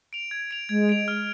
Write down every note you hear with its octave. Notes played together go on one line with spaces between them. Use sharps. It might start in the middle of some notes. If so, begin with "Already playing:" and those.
D7 F7
G#6
D7 F7
G#3 G#6
D7 F7
F6